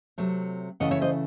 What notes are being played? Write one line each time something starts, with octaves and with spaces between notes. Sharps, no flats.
C3 F#3 A3
C#3 E3 A3 D#5 F#5
C#5 E5
C5 D#5